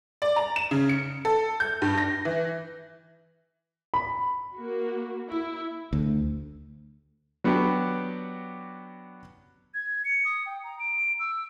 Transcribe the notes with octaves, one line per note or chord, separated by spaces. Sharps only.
D5
A#5
E7
C#3
C#7
A4
G6
G2
A#6
E3
B5
A#3 F#4
E4
D2
F#3 B3 D4 F#4 G4
G#6
C#7
D#6
G5
A#5
D7
E6